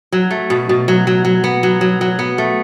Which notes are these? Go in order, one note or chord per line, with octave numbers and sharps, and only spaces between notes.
F#3
A3
B2
B2
F#3
F#3
F#3
B3
F#3
F#3
F#3
B3
A3